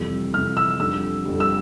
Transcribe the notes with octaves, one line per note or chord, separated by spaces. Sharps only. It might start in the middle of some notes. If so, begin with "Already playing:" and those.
Already playing: F2 C3 E3 G3 E6
F2 C3 E3 G3 F6
E6
F2 D3 G3 E6
F2 D3 G3
E6